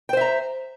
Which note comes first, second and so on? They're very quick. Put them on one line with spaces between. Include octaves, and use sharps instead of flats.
G5 C5 E5 A#5